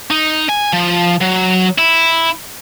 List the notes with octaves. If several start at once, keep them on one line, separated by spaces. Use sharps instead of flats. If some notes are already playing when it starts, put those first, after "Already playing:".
D#4
G#5
F3
F#3
E4